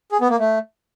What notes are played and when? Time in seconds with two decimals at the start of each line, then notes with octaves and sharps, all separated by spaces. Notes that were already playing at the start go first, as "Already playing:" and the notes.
0.12 G#4
0.21 B3
0.30 A#3
0.39 A3